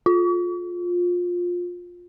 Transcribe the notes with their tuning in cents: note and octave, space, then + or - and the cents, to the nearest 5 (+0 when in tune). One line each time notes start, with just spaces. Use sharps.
F4 +20